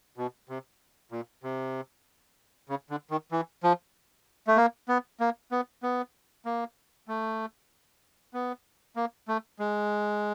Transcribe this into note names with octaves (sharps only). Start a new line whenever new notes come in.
B2
C3
A#2
C3
C#3
D3
D#3
E3
F3
A3
A#3
B3
A#3
B3
B3
A#3
A3
B3
A#3
A3
G#3